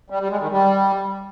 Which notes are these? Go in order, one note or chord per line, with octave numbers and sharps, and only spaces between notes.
G3
G3
G#3
D#3
G3